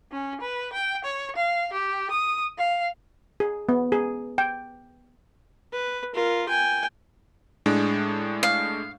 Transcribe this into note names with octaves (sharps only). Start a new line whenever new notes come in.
C#4
B4
G5
C#5
F5
G4
D#6
F5
G#4
B3
G#4
G5
B4
F4 A#4
G5 G#5
A2 G#3 D4
F5